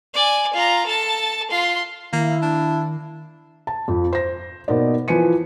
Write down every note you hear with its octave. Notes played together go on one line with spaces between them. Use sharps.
D5 G#5
F4 A#5
A4 A5
F4 C6
D#3 A#3 E4
D4
A5
F2 F3
C5 A#6
B2 A#3 B3 D#4 C5 D5
E3 F3 B4 G#5 C#7 D#7